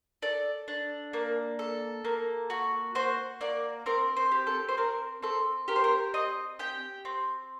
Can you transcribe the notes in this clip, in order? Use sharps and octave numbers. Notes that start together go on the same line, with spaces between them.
A4 D5
D4
A#3
A4
A#3
F#4
F#4 C5
A#3 D5
C4 A#4
C5
G4
A4
C5
C4 A#4
C4 A4
G4 A#4
C5
A#4
C4 D#5
G4 G5
C4